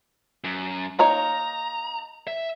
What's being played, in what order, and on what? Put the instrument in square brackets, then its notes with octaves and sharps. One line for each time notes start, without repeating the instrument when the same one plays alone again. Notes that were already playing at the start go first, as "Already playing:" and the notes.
[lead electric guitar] F#2
[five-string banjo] A#3 D#4 C#5 [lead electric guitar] A#5
[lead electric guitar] E5